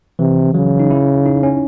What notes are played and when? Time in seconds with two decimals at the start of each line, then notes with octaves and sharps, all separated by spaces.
0.19 C3 E3
0.54 C#3 F#3
0.79 D#4
0.91 E4
1.26 D#4
1.43 C#4